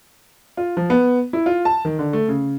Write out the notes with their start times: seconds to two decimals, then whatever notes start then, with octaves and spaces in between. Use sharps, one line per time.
0.57 F4
0.77 F3
0.90 B3
1.33 E4
1.46 F4
1.65 A5
1.85 D#3
1.99 D3
2.13 A3
2.28 C#3